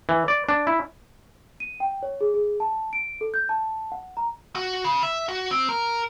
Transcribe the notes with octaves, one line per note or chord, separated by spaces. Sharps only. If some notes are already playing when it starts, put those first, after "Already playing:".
E3
D5
D4
E4
D#7
G5
C#5
G#4
G#4
A5
D7
A4
G6
A5
F#5
A#5
F#4
C#3
E5
F#4
C4
A#4